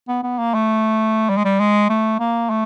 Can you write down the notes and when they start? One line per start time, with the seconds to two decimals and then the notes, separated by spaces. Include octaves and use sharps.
0.08 B3
0.23 B3
0.38 A#3
0.54 A3
1.29 G3
1.37 G#3
1.45 G3
1.60 G#3
1.89 A3
2.20 A#3
2.50 A3